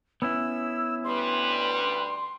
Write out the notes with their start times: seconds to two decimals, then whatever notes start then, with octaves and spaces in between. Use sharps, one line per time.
0.22 B3 C#4 E4 E6
1.04 D2 G3 B4 C6